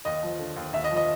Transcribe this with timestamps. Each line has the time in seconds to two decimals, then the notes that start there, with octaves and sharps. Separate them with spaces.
0.05 D#2 D#5
0.23 F3
0.39 D3
0.56 D#2
0.73 D#2 E5
0.84 D#5
0.91 F3
0.96 D#5